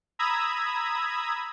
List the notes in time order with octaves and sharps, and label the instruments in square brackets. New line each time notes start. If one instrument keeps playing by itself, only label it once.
[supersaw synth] A#5 B5 D#6 E6 G#6